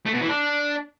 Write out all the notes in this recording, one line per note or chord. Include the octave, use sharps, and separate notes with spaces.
A3
B2
E3
D4